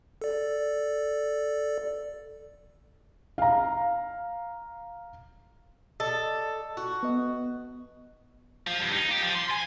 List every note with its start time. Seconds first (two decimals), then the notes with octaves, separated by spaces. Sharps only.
0.22 A4 D5
3.38 F5 A#5
6.00 A4 D5 D#5
6.77 F#4
7.03 B3 D#5
8.67 F3
8.80 G2
8.92 D#4
9.10 G4
9.22 F3
9.34 C6
9.50 G#5